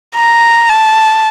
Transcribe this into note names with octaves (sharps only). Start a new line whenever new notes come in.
A#5
A5